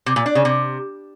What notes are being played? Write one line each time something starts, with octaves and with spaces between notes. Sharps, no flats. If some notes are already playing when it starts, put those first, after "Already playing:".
C3
A#2
D4
C#3
C3